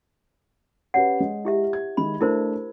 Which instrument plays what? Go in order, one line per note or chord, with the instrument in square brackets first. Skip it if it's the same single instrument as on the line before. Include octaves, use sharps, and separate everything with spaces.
[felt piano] C#4 G4 B4 [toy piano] C#5 F#5
[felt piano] G#3
[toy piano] E4 G4 E5
[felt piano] G#6
[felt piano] D#3 G#3 [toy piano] B5
[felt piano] A3 D4 [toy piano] E4 A#4 C5